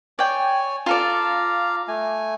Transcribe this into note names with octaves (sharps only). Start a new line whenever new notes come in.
C#5 D5 G5 G#5
F4 A4 D5 F5 A#5
A3 G#5